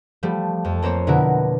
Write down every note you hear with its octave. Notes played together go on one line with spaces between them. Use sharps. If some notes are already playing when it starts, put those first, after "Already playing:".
F3 G3 A3
F2
A#3 C4 C5 C#5
B2 D3 E4 F#4 A#4